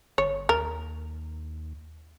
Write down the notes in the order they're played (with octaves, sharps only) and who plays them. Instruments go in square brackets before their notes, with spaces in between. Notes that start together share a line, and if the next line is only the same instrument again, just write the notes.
[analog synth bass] G1 [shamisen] C#5
[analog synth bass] D#2 [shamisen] A#4